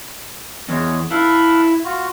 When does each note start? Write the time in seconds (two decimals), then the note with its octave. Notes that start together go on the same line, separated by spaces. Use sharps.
0.69 E2 G#3 C#5
1.11 E4 A4 B4 F5
1.84 F4 F#4